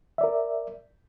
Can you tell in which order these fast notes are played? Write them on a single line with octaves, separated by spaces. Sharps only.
E5 D5 A#4